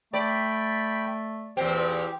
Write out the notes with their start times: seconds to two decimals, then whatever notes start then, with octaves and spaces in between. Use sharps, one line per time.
0.14 A3 D5 G5 B5
1.57 E2 A#2 C4 G4